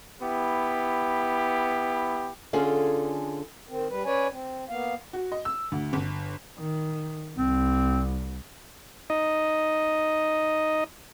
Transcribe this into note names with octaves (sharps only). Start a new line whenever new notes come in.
B3 E4 G4
D3 C#4 F4 G#4 A4
D#3 C4
G3 B4
C#4 B4 C#5 D5 G#5
C4
A#3 B3 F5
F#4
D#5
E6
D2
G1
D#3
C2 C4
D#4 D#5